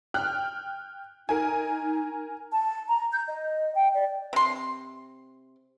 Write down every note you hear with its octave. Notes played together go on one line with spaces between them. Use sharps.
G5 F6 F#6
D#4 A#4 G#5
A5
A#5
G6
D#5
G5
D5
C3 C6